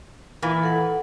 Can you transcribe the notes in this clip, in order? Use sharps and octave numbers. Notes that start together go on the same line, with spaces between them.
A#2 E3
A4 F#5